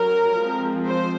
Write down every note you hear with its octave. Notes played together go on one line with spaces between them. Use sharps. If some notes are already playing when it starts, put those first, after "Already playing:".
Already playing: F#3 C#4 A#4
F3 G#3 C4
C5